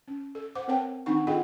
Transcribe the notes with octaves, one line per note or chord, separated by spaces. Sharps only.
C#4
A4
C5 F#5 D6
C4 A#4 B4 C#5 G5 A5
D#3 C4 D4 D#4 F#5 C#6
F4 G#4 A4 D#5 F#5 G5